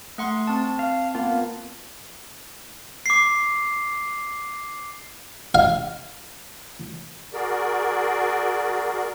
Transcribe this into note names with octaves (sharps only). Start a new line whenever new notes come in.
A3 F#5 C6
C4 A5
F5
A#3 B3 F4
D6 C7
F5
F#4 G#4 A#4 D5